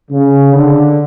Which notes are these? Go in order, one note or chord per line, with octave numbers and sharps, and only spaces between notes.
C#3
D3